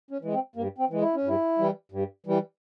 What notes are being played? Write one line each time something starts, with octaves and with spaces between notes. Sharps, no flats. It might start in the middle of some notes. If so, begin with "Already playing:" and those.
C#4
E3 G#3
C4
G2 A#3
C4
E3 G#3
E4
C#4
G2 E4
E3 G3
G2
E3 G3